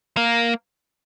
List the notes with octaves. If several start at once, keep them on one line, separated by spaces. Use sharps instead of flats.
A#3